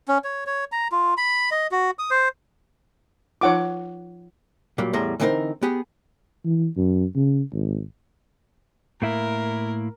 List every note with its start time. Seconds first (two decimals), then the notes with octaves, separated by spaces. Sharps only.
0.08 C#4
0.24 C#5
0.47 C#5
0.72 A#5
0.92 F4
1.17 B5
1.51 D#5
1.71 F#4
1.99 D#6
2.11 C5
3.41 F3 D#4 F4 C#5 F#5 D6
4.78 A#2 F#3 G3 A#3
4.93 E2 A2 G3 G#4 A#5 C6
5.20 D3 E3 C4 D#4 A#4
5.63 B3 G4 G#4
6.45 E3
6.76 F#2
7.15 C#3
7.53 G#1
9.02 A2 A#3 E4 A#4